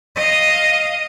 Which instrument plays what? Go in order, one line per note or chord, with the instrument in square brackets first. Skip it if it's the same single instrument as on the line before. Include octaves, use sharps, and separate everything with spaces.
[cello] D#5 F5